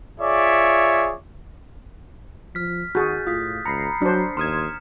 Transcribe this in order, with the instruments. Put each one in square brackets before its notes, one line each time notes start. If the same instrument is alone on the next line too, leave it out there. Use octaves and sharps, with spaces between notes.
[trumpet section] F4 G#4 C#5 D5 E5
[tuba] F3 [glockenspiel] F6 B6
[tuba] D#3 [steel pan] F#4 G#4 [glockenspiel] F#6 G6 A6
[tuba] A2 [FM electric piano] F4 [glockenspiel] D#6 B6
[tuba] C#2 [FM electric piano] A#5 B5 C7 [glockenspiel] C#7
[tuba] F#3 [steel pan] D4 C5
[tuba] D#2 [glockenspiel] A#5 F6 E7 [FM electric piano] C6 D#6 G#6